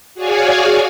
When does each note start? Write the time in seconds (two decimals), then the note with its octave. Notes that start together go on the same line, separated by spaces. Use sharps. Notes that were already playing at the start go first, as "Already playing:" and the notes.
0.15 F#4 G#4 C#5 D5 F5 G#5